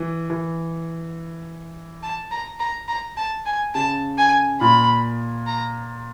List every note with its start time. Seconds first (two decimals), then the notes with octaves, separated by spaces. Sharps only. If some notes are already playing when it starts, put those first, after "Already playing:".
Already playing: E3
0.30 E3
2.03 A5
2.32 A#5
2.59 A#5
2.88 A#5
3.17 A5
3.46 G#5
3.74 C#3 A5
4.18 G#5
4.61 A#2 B5
5.47 A#5